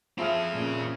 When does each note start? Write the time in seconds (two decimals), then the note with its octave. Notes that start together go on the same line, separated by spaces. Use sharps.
0.18 F3 C4 E4 G#4 F5
0.53 A#2 C#3